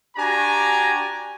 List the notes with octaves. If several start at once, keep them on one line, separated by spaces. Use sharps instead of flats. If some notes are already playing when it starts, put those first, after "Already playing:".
D4 F#4 G4 G#5 A#5